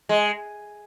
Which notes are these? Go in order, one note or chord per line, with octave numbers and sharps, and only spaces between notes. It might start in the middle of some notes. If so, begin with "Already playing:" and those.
G#3